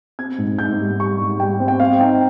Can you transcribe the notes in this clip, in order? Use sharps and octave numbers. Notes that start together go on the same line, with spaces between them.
C4 G#6
G#2
G#2 G6
G3
G3 C#6
G#2
G3 G5
C4
G5
C4 F5
D#4 G5